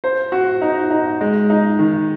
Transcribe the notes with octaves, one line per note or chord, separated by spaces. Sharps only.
C5
F#4
D#4
D#4
G#3
D#4
D#3